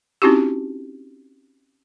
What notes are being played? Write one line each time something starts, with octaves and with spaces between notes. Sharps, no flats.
C4 C#4 D#4 E4 F#4 G4